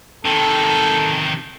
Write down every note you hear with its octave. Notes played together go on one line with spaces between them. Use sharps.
C3 D#3 A4